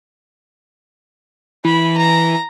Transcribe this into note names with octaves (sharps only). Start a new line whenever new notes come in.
E3 B5
A#5